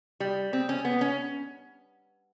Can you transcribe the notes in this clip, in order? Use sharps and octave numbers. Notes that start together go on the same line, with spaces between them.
G3
C4
C#4
B3
C#4